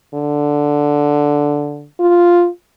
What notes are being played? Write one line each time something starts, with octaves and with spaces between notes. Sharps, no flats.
D3
F4